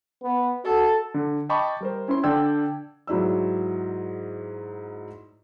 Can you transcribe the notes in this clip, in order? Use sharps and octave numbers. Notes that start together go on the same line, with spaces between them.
B3
F#4 A4
D3
D#5 G5 A5 B5 C#6 D6
G3 A#4 C5
C#4 E4 C5 C6
D3 D4 D5 G5 E6 G#6
G#2 F#3 E4 D5 E6